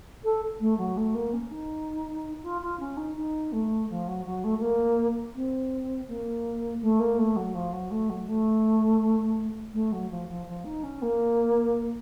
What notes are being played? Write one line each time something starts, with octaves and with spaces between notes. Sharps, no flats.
A4
A3
F#3
A3
A#3
C#4
D#4
F4
F4
C#4
D#4
D#4
A3
F3
F#3
F#3
A3
A3
A#3
C4
A#3
A3
A#3
A3
F#3
F3
F#3
A3
F#3
A3
A3
F#3
F3
F3
F3
D#4
C#4
A#3